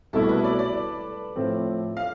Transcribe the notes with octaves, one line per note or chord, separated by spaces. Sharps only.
C2 B2 A3 E4 A4
B4
D5
D5
A2 F3 A3 C4
F5